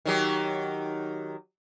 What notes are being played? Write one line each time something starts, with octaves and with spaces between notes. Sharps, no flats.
D#3 F#3 G4